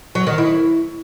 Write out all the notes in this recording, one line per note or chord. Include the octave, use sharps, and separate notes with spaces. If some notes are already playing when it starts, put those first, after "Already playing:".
F#3
D#3
E4